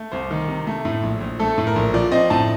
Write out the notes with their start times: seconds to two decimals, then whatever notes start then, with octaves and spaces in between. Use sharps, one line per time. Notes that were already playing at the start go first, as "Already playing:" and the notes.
Already playing: A3
0.12 C2 C5
0.31 D#3
0.48 C3
0.67 A3
0.85 A2
1.03 A#1
1.21 A#1
1.39 A3 A4
1.58 A2
1.67 A#4
1.76 A#1
1.94 F3 D5
2.11 C4 D#5
2.30 A2 A5